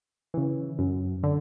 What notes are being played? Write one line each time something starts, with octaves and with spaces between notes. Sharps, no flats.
C#3 E3
F#2
D3